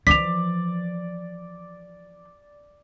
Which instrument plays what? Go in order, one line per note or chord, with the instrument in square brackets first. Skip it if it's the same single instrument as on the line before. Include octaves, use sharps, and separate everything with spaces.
[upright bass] E3 F3 [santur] D5 [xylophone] B6 F7